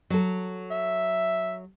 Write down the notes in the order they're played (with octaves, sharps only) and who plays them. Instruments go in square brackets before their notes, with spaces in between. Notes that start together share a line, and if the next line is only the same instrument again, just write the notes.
[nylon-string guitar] F#3 A4
[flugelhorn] E5